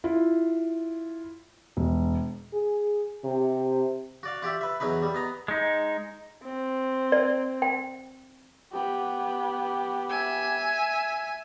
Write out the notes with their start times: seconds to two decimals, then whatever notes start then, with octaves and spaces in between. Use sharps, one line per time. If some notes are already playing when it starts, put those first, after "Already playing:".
0.04 E4 F4
1.77 E1
2.53 G#4
3.24 C3
4.23 F#4 D5 F5
4.42 F4 G4 D5 E5
4.61 B4 E5
4.80 E2 F#3 D#4 B4
5.03 G3
5.14 B3 D#5 A#5
5.48 G#3 D#4
6.44 C4
7.12 D5
7.62 G5
8.72 B3 G4
10.10 E5 G#5